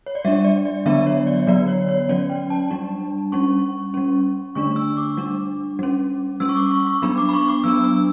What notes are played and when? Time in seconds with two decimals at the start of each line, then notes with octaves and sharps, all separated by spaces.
0.06 C#5
0.15 D5
0.25 G3 D4 E5
0.44 D5
0.65 D5
0.86 D3 F#3 B3 D4 E5
1.07 C#5
1.27 D5
1.47 D3 F#3 B3 D5
1.68 C#5
1.89 C#5
2.09 F#3 C#4 D5
2.29 G5
2.50 A5
2.71 G3 D4
3.32 G3 C#4 C#6
3.94 G3 C#4
4.55 D3 A3 D4 C#6
4.76 E6
4.97 D6
5.17 G3 D4
5.79 G3 C#4
6.40 G3 C#4 E6
6.49 C#6
6.56 D6
6.71 C#6
6.87 C#6
7.02 F#3 B3 D4 B5
7.18 D6
7.29 B5
7.33 C#6
7.48 D6
7.64 F#3 B3 D4 E6
7.84 E6